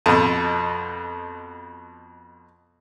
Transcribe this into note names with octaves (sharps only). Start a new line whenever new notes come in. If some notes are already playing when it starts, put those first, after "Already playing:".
F2 B2